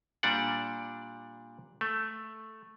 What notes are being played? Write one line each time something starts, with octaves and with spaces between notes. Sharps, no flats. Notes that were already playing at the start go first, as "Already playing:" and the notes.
A#2 G3 D4 D5 F#5
A3